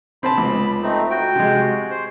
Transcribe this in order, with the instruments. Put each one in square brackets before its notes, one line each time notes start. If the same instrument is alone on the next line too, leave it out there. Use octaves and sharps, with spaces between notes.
[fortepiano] C4 C5 A5 [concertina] B5
[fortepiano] C#2
[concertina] A3 C4 D#4
F#4 G5
[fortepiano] C3 G#3
[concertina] C5